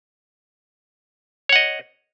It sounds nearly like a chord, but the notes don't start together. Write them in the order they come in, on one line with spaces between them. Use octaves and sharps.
C#5 F#5 D#5